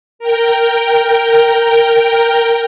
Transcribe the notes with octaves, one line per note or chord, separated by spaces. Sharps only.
A#4 G5